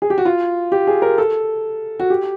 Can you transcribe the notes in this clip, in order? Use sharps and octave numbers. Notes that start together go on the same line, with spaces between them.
G#4
G4
F#4
F4
G4
G#4
A#4
A4
F#4
G4